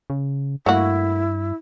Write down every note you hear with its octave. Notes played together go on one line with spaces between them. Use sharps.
C#3
G2 A3 A#3 E4 F#4